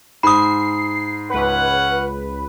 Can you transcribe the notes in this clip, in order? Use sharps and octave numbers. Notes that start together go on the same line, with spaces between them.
G#2 B5 D#6 C7
C#2 C#4 B4 F#5